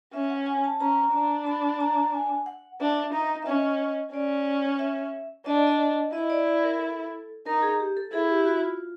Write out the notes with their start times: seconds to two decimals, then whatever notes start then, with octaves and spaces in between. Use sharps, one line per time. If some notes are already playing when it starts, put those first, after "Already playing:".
0.13 C#4 E5
0.30 F#5
0.46 G#5
0.64 A5
0.80 C#4 A#5
1.13 D4
1.46 B5
1.80 A#5
2.14 G#5
2.46 F#5
2.81 D4 E5
3.13 D#4
3.43 E5
3.46 C#4 D#5
4.13 C#4 D5
4.79 E5
5.46 D4 D#5
5.56 D5
5.67 D#5
6.13 E4 D#5
6.30 D5
6.47 D5
6.64 A#4
6.79 A4
7.46 D#4 A#4
7.62 G#4
7.80 G4
7.97 A4
8.13 E4 G#4
8.30 G4
8.45 F#4
8.63 F4